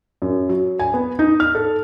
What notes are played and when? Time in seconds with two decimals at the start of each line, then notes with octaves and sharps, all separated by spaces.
0.22 F#2
0.49 F#3
0.79 G#5
0.94 B3
1.19 D#4
1.40 F6
1.55 A4